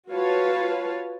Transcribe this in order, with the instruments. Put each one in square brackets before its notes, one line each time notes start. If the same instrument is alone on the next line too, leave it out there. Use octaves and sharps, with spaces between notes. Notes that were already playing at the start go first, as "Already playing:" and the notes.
[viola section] F4 F#4 B4 C#5 F5 A5